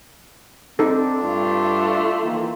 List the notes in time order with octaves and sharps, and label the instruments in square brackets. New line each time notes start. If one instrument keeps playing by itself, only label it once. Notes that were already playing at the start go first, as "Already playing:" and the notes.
[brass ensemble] C4 [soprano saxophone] D4 [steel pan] D#4 A4
[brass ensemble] G2 [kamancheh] A3 F4
[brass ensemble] D#3 E3 A#3